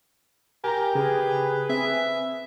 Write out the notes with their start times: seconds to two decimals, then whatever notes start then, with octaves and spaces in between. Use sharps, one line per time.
0.64 G4 A#4 G#5 A#5
0.95 C#3 G#4 B4
1.69 C4 E5